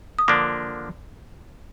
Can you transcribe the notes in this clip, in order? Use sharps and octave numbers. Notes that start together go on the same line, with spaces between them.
D#6
D3 F3 A#3 D4 D6